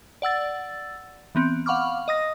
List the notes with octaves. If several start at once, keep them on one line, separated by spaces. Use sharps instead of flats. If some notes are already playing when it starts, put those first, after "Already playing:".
D5 F#5 E6 A6
E3 B3 C4
F5 F#5 B5 C#6 D6 F6
D#5 D#6 A#6